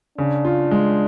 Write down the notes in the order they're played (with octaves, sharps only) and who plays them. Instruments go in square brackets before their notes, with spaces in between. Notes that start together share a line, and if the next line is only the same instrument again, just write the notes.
[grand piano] C#3 [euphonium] D4
[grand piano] F4
G#3